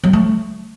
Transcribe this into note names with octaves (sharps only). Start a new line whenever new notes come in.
F#3
A3